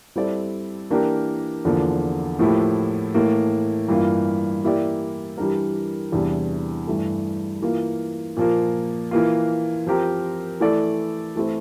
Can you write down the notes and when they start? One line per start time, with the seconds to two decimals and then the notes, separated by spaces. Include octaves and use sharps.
0.16 G3 C4 E4 A4 D5
0.90 E3 A#3 D4 G4 A#4
1.65 E2 D3 F3 A#3
2.39 A2 F3 A#3 E4 G4
3.14 A2 E3 A#3
3.89 G2 E3 A#3 F4
4.64 E3 A#3 E4 G4 D5
5.38 E3 G3 D4 G4 A#4
6.12 E2 C3 E3 G3 D4
6.87 G2 E3 A3
7.62 E3 A#3 F4
8.37 A#2 F3 A#3
9.11 E3 A#3 F4
9.87 F3 C4 G4 A#4
10.60 E3 A3 E4 A4 D5
11.36 E3 A3 C4 E4